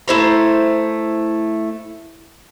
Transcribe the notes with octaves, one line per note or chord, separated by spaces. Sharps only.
A3 E4 C5 A#5